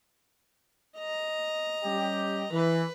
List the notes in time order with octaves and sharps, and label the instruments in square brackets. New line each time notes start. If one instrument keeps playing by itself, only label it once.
[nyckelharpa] D#5 A#5
[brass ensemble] G3 C#4 G4
[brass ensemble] E3 [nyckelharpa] B4